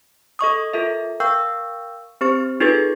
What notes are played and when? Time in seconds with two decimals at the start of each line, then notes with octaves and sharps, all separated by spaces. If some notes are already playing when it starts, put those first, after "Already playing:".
0.39 A4 D#5 C#6 D#6
0.73 F4 A4 A#4 E5
1.20 A#4 F5 G5 C#6 E6 G6
2.21 C4 G4 C5 C#6 A6
2.60 D#4 F4 G#4 A4 B4 A6